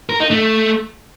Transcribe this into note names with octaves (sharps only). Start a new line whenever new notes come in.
A#4
D#4
A3